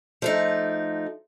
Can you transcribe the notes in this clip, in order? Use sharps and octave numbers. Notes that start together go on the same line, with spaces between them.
F3 A3 D#4